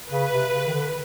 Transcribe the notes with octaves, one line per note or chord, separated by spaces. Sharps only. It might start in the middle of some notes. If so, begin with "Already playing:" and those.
C#3 B4
C3
C#3
D#3
D3